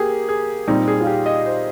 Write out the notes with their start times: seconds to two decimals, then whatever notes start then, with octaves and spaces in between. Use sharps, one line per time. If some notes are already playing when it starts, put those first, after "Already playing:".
Already playing: A#3 G4 G#4
0.29 G#4
0.67 A#2 G3 C4 D#4
0.88 G#4
1.01 F4
1.07 G4
1.26 D#5
1.46 C5